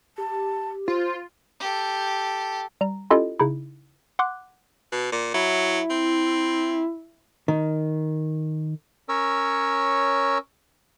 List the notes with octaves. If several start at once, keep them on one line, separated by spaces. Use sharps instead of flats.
G4 A5
F4 C5
G4 A4
G3 A#5
C#4 E4 F4 G4 A4 D#5
C#3 D#4 E4
F#5 C6 D6 F#6
B2
A#2
F#3 E4
C4
D#3
C#4 A#4 C#5 E6